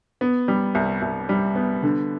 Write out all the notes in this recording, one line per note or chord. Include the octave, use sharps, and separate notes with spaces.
B3
G3
C2
C2
G3
B3
D3